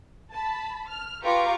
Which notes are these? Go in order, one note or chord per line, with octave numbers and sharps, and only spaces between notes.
A5 B5
F6
F4 G4 B4 A#5 C#6 D6